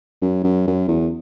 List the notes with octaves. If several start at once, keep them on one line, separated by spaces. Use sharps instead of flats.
F#2
F#2
F#2
E2